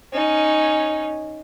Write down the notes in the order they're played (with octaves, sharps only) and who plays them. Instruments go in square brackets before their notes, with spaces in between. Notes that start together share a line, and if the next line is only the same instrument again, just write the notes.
[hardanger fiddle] C#4 D#4